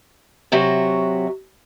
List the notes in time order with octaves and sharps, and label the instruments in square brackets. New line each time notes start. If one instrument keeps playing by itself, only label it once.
[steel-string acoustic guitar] C3 F#3 F#4 E5